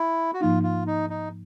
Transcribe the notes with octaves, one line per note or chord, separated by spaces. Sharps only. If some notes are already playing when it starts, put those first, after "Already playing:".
Already playing: E4
F#4
G#2 F3 A#3 D#4 F4
F4
D#4
D#4